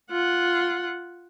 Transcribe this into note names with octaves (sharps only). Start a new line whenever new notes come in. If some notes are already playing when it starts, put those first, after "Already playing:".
F4 F#5